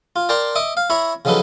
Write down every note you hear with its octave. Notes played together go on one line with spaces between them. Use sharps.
F4
A#4 D5 G5 A5 A#5 C6
D#5 E5 D6
F5
E4 C#5 E5 A#5 B5
C#3 F3 F#3 D#4 A4 B4